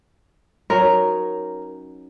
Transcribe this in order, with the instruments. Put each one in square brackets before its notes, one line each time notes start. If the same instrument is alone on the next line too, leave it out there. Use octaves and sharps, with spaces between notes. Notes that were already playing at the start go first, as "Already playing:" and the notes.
[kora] F#3 C#4 D#4 [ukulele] A#4